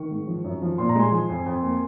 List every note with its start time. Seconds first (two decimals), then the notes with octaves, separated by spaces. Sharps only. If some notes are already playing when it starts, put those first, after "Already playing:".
Already playing: D#3 C#6
0.11 G#2
0.27 F3
0.44 F#2
0.62 F3
0.78 A#2 C6
0.89 A#5
0.96 G#3 G#5 C6
1.12 F3
1.29 F2
1.46 F2
1.63 A#3